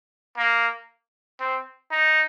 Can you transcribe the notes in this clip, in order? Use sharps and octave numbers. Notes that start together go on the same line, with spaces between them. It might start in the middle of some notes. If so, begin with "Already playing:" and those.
A#3
C4
D#4